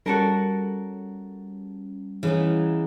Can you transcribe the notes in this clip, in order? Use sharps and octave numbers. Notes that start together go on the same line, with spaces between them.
G3 C#4 F#4 A4 A#4
C#3 E3 B3 D#4